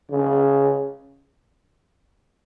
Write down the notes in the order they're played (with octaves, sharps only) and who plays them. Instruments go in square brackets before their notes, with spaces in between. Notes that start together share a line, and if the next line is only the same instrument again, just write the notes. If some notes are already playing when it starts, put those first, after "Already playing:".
[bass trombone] C#3